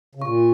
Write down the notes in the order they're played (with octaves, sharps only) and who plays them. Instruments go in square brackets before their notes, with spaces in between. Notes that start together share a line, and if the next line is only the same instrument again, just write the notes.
[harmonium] C#3
[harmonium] A#2 [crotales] C#6